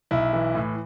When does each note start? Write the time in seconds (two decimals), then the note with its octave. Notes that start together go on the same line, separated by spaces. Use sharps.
0.11 B1 E4
0.33 E3
0.55 A2